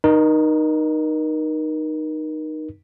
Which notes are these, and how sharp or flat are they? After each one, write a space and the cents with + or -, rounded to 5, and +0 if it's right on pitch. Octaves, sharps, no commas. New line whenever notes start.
D#4 -15 A#4 +30